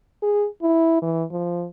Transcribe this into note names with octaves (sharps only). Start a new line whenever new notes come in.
G#4
E4
E3
F3